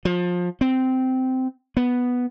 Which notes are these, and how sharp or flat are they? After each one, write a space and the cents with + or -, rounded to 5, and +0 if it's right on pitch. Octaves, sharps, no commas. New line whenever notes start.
F3 +25
C4 -15
B3 -5